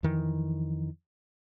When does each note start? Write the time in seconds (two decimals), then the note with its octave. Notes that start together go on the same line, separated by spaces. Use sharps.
0.03 F2 D#3 E3